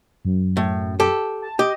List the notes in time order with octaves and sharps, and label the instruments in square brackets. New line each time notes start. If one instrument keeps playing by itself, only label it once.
[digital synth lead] F#2
[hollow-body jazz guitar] A2
G4 A4
[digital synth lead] A5
[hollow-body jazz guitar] G4 [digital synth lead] D#5